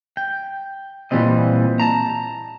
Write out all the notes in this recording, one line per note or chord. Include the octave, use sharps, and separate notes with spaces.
G5
A#2 E3 G3 C4 D#5
A5 A#5